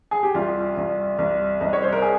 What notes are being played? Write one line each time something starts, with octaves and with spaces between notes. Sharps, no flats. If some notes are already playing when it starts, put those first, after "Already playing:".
G#4
G4
C2 F4
C2
C2
C2 D#5
C#5
C5
A#4
G#4